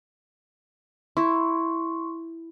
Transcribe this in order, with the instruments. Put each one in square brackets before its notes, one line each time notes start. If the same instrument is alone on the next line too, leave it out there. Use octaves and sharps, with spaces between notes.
[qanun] E4 [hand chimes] C6 C#6